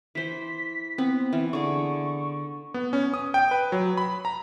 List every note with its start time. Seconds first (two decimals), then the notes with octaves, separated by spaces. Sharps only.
0.15 E3 C5 B6
0.98 B3 C4
1.33 E3
1.53 D3 G#4 C#6
2.74 B3
2.93 C#4
3.14 D#6
3.34 G5
3.51 B4
3.72 F#3
3.97 B5
4.25 A#5